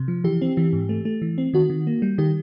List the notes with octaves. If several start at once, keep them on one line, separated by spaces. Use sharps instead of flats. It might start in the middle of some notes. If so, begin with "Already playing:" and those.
Already playing: C3
F3
E3 G4
C4
E3
G#2
A3
A3
E3
C4
D#3 F#4
D#3
A#3
G3
D#3 G4